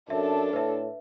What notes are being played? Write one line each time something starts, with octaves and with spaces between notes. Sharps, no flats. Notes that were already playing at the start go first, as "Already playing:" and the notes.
F#2 D4 A4 E5
A2 B4 E5